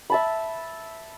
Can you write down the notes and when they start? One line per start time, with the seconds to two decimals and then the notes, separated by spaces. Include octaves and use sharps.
0.10 E5 A5 B5